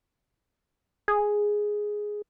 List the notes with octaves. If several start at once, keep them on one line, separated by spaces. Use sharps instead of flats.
G#4